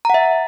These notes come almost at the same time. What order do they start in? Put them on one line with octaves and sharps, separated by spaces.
A#5 F#5 E5